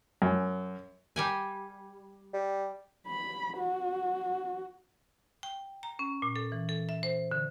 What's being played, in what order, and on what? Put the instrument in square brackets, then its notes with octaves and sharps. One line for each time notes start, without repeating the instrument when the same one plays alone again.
[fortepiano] F#2
[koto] G3 G4 G#5
[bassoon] G3
[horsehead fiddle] B5
F#4
[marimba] G5
A#5
C#4
A#2
A4
E3
A4
E5
C5
D3